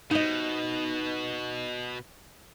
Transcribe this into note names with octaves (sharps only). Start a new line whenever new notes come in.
B2 D#4 D#5